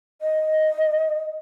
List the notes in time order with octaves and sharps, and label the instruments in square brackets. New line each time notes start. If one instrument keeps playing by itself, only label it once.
[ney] D#5